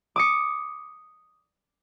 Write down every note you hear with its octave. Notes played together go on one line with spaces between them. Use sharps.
D6 D#6 C#7